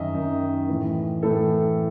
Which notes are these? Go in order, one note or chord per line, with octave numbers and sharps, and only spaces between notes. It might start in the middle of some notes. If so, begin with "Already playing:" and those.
Already playing: F#2 D#3 D#5 E5
F#2 D#3
A2 E3
A2 E3 A4